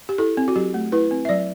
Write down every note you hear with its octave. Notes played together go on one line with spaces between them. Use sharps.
G4
E4 A4
C4
F#4
F#3 G4
A3
E4 B4
C4
E5
F#3 D5